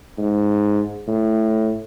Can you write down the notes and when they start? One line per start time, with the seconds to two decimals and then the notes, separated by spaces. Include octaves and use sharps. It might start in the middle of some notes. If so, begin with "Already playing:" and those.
0.18 G#2
1.08 A2